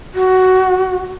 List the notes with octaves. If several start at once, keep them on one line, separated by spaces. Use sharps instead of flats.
F#4